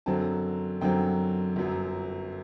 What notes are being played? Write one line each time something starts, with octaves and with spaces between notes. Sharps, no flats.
F#2 D3 F#3 C4 A5
F#2 D3 F#3 C4 G5
G1 F#2 F#3